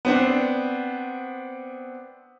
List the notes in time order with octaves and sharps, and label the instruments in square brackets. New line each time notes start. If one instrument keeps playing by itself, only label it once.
[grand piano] B3 C4 D4